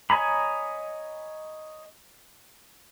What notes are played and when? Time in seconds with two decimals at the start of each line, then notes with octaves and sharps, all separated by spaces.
0.10 C#5 D#5 G#5 A#5 B5